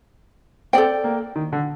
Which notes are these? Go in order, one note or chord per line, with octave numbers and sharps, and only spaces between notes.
C4 A4 D5 G5
A#3
D#3
D3